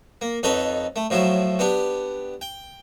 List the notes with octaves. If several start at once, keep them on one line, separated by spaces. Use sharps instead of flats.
A#3
F2 D#4 A4 B4 C#5
A3
A2 F3 F#3 E4
B3 D4 G4
G5